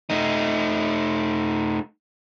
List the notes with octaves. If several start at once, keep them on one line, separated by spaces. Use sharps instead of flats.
A3 D#4